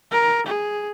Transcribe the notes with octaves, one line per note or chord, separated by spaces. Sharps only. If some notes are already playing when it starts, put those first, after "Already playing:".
A#4
G#4